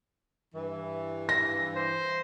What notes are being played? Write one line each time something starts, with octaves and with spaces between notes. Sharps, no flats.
G2 E3
A#6
C5